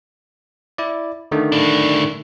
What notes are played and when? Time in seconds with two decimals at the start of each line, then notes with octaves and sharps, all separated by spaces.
0.78 E4 D5
1.32 D3 D#3 A3
1.52 A2 D4